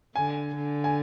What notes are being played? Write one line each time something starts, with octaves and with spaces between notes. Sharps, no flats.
D3 G#5
D3
G#5